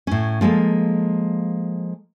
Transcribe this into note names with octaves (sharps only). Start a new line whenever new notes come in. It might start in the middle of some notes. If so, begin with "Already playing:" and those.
A2 C#4
F3 G#3 A#3 A4